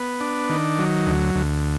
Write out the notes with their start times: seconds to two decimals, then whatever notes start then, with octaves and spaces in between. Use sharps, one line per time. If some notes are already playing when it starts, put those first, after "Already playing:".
Already playing: B3
0.21 D4
0.50 D#3
0.78 F#3
1.06 D2
1.35 D2